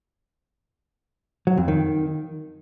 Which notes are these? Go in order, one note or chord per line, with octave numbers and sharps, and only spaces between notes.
F#3
F2
D#3